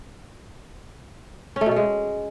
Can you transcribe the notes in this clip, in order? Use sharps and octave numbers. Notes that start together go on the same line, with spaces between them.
C#4
A3
B2
A3
G#3